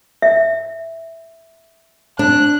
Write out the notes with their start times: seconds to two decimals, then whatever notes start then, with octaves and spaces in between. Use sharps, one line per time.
0.22 E5
2.19 D4 F#6